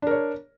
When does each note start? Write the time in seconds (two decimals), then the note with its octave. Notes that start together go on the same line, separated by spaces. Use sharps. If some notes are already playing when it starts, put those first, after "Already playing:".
0.02 D4
0.07 A#4
0.11 C#5